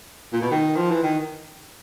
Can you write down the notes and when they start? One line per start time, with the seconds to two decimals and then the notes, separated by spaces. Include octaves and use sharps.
0.33 A#2
0.41 B2
0.51 D#3
0.76 F3
0.91 E3
1.03 D#3